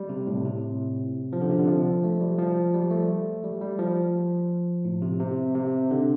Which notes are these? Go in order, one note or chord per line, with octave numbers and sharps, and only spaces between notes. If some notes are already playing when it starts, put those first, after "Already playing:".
Already playing: G3
C3
A2
C3
F3
D3
C3
D3
F3
A3
G3
F3
G3
A3
G3
G3
F3
A2
C3
C3
C3
D3